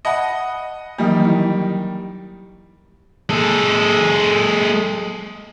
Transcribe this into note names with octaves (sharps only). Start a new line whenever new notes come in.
D#5 E5 F#5 A5 B5
D#3 E3 F#3 G3 A#3
E4
G#3 A4